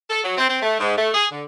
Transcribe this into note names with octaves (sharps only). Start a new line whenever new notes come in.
A4
F#3
C4
C4
A3
G#2
A3
G#4
D3